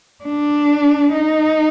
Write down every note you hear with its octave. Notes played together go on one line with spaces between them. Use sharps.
D4
D#4